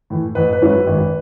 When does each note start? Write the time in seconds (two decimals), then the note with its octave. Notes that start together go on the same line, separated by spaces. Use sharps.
0.10 A2 E3
0.35 A1 B4
0.53 B4
0.61 G#2 F#3 C#4 E4
0.69 B4
0.87 G#1